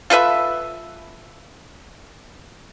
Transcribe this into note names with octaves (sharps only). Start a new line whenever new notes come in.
F4 A4 B4 E5